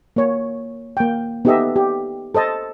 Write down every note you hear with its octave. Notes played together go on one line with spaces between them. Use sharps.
A#3 C#5
A#3 G5
B3 D#4 G4 A4 D#5 E5
G4
A4 C5 D#5 A5